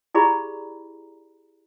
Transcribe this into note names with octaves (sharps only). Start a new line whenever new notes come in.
E4 G4 G#4 D5 A#5 B5